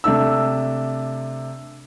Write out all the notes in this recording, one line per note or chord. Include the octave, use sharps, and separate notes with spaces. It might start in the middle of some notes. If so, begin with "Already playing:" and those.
C3 A3 D4 E6